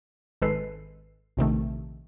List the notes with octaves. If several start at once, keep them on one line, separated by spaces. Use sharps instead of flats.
G#1 G#3 A4 B4 C7
A#1 C3 D#3 A3